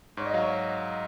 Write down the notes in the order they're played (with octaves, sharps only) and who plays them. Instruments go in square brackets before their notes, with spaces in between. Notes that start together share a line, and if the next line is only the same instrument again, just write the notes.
[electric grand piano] G#2 [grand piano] C#5
[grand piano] D#5
[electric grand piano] F#3 [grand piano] F5
[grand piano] C#5